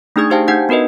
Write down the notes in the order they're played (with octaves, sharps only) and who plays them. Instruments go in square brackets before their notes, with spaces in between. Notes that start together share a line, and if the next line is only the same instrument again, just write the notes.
[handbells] A3 D4 D#4 G#4 D#6 G#6
D#4 G4 C5 F5 G5 A5
D4 D#4 F#5 G#5 G6
B3 F#4 A#4 B4 D#5